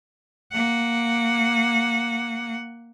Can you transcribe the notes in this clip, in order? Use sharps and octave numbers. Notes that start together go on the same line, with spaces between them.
A#3 F#5